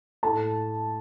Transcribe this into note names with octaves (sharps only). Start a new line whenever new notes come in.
A2 A3 A5